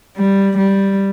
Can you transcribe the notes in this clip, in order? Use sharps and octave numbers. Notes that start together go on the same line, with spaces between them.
G3
G3